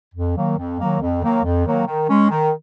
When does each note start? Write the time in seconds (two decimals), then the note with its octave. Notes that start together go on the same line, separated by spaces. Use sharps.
0.15 F2
0.37 D#3 F#3 A#3
0.58 F2
0.79 D#3 F#3 A#3
1.01 F2
1.22 D#3 F#3 A#3
1.44 F2
1.65 D#3 F#3 A#3
1.87 D#3
2.08 G#3 C#4
2.30 D#3